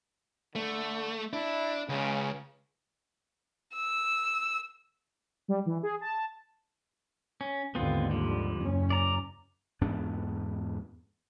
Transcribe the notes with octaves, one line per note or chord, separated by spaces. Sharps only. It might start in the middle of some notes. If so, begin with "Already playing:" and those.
D3 A3
D4 E4
C#2 C#3
E6
G3
E3
G#4
A5
C#4
G#1 D#2 D3 B3 C4 F4
F3 G3
F#1 C#4
D5 A#5
E2 G#2 B3 D4